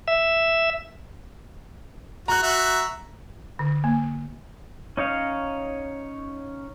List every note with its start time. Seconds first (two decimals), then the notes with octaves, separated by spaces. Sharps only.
0.08 E5
2.28 F#4 A#5 F#6
2.43 F#4 E5
3.59 D3
3.84 A#3
4.97 C#4 D#4 C#5 F5